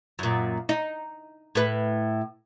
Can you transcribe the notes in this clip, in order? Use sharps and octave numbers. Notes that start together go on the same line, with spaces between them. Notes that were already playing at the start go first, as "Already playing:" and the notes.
F#2 A#2
D#4
A2 B4